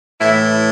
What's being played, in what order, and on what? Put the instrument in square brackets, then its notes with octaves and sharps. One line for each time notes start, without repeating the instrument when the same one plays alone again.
[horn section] A2 E3 E4